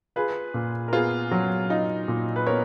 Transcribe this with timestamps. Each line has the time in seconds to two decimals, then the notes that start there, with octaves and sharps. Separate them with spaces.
0.16 F4 G#4 B4
0.54 A#2
0.88 A#4
0.93 B3 F4 G#4
1.31 F#3
1.70 D#4 F4
2.08 A#2
2.36 B4
2.46 B3 A#4 C#5